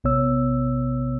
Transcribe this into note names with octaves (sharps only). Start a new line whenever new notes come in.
A#1 C3 B3 C#5 E6